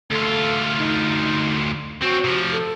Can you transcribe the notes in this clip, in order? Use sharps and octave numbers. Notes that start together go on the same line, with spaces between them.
D2 F4 A4
D#4
C4 C#4 F#4
C3 F3
A4